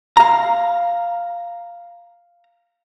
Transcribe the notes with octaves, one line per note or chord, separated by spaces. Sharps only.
F5 A#5